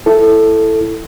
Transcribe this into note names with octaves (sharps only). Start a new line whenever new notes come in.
E4 A4